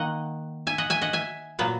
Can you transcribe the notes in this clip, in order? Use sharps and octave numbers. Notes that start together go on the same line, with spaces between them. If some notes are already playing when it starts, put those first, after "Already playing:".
Already playing: D#3 A#3 D#5 F#5
E5 G#5
D#5 F#5
E5 G#5
D#5 F#5
E5 G#5
A#2 F#3 B3